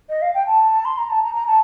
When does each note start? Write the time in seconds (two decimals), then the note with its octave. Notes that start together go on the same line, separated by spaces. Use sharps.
0.09 D#5
0.21 F5
0.34 G5
0.46 A5
0.85 C6
0.98 A#5
1.10 A5
1.23 A#5
1.35 A#5
1.47 A5